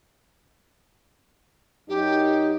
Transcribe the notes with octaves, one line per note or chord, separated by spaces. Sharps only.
F#2 D#4 G4